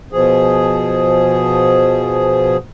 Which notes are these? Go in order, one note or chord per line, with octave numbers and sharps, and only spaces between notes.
B2 F3 G#4